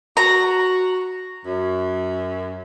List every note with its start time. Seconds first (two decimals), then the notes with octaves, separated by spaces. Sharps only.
0.17 F#4 A#5
1.45 F#2